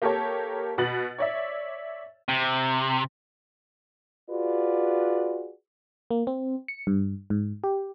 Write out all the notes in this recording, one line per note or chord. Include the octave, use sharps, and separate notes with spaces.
A#3 G4 A4 A#4 C#5 A5
B2 F#4 B4 A6 F#7
C#5 D5 E5
C3
F4 F#4 G#4 B4 D5
A#3
C4
C#7
G2
G#2
G4